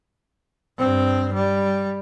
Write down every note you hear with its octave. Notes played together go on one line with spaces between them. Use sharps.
G2 C4
G3